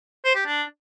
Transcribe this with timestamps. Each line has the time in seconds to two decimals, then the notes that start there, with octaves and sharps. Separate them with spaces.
0.25 C5
0.35 G4
0.46 D4